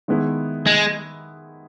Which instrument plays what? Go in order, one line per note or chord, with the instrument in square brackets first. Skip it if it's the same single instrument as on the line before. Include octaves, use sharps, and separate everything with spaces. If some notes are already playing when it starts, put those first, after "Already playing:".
[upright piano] D#3 G#3 B3 E4
[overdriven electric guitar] G#3